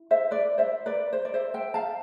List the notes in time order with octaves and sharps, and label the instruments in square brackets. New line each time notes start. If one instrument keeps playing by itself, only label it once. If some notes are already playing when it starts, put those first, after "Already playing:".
Already playing: [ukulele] E4
C5 E5
B4 D5
C5 E5
B4 D5
C5
D5
C5 E5
E5 G5
F5 A5